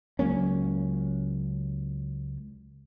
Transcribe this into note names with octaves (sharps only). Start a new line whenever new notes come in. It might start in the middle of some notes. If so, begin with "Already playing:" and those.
C#2 F#3 A#3 C#4